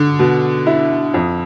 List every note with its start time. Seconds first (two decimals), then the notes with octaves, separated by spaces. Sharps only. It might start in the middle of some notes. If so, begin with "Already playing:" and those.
Already playing: D3
0.19 B2
0.66 E4
1.14 F2